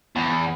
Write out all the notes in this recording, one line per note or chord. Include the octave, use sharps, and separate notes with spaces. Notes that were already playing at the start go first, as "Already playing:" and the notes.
E2